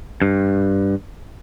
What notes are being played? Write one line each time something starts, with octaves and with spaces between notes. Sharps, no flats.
G2